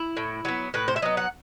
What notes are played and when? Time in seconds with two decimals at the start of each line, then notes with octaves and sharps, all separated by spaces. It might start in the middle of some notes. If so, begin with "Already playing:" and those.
Already playing: E4
0.17 A2
0.45 F#3 B3
0.74 A2 B4
0.88 C5
0.96 E5
1.02 F#3 B3 D#5
1.17 F#5